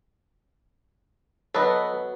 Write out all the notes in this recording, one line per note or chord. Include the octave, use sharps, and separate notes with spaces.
F#3 B3 A4 B4 D#5